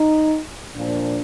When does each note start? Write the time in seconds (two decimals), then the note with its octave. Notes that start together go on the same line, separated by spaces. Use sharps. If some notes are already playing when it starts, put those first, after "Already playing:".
Already playing: D#4
0.76 A#2 F3 D4